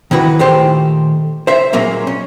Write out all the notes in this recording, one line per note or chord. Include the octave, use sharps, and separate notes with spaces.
D#3 E3 E4 F#4 B4
A#2 D#3 A3 G4 C5
C5 E5
A#2 F#3 G#3 A#3 C#4
C#4